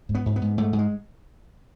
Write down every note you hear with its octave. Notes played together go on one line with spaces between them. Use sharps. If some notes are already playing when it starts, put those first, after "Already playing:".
G#2
B3
G#2
B3
G#2
G#2 A3
G#2
G#3